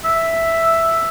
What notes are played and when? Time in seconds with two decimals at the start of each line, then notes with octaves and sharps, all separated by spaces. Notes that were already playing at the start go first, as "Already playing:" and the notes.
0.04 E5